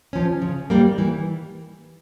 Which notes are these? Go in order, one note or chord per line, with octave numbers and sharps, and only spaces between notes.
F3 C#4
C#3
G3 A#3
E3